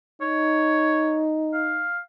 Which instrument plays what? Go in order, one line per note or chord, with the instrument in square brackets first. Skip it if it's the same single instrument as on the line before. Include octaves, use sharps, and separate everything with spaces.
[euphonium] D#4 [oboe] C#5
[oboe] F5